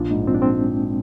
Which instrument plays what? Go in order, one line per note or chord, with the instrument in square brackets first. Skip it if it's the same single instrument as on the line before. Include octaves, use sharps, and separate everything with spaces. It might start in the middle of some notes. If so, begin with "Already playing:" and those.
Already playing: [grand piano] A#1 [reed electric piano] A#3 D4
[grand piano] G#2
[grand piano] A#1 [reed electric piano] C4
[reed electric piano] D4
G#3 C4